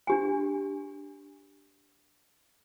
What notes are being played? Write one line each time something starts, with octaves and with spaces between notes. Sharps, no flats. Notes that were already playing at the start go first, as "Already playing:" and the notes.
D4 G4 G#5